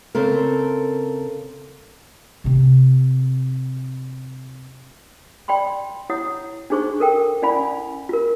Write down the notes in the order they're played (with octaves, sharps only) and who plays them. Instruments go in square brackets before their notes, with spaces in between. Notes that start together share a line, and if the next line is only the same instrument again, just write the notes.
[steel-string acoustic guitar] C#3 C4 A4 A#4
[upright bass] C3 C4
[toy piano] D5 G5 B5 C6
E4 C#5 F#5 D#6
D4 D#4 G#4 C5 C#6
A4 A#4 G5
C#4 E4 D5 F5 G#5 B5
F4 A#4